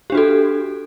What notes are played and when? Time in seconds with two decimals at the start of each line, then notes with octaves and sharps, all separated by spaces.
0.10 G4
0.12 D4
0.15 F#4
0.17 A4